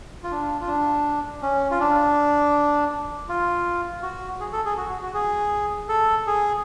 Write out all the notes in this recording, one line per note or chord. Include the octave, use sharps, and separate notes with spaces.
F4
D4
F4
D4
C#4
F4
D4
F4
F#4
G#4
A4
G#4
F#4
F#4
F#4
G#4
A4
G#4